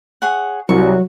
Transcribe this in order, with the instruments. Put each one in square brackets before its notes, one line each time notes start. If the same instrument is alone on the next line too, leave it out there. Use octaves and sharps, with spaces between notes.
[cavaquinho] G#4 C#5 F#5
[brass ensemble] C2 [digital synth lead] F#3 [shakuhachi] F#4 [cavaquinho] C#6